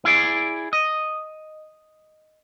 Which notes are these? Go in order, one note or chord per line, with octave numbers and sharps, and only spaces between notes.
E4 G#4 D5
D#5